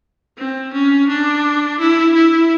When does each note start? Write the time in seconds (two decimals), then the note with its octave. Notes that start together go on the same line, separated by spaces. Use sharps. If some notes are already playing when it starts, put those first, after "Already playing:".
0.38 C4
0.73 C#4
1.08 D4
1.80 E4
2.15 E4